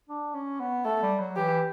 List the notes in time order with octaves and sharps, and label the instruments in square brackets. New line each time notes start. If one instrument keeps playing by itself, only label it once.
[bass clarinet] D4
C#4
B3
[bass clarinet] A3 [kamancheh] A4
[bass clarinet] G3
F#3
[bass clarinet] E3 [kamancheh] G4